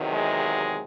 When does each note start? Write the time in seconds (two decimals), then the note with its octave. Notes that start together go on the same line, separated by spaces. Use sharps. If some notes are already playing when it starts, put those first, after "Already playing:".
Already playing: E2 C3 D#3 F#3
0.13 G#3